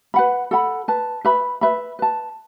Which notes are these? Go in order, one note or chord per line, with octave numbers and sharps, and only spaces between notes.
B4 F#5 B5
A4 F#5 B5
B4 A5
B4 E5 B5
B4 E5 B5
B4 A5